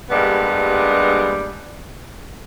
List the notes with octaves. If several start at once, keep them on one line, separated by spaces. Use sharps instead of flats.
G2 G3 G#3 A#3 B3